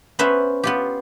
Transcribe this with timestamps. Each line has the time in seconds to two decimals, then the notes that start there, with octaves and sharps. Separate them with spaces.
0.19 B3 C#4 B4 C5 E5
0.63 B3 F4 G4